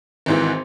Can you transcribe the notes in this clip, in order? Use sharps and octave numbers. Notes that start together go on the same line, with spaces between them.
G#1 G#2 E3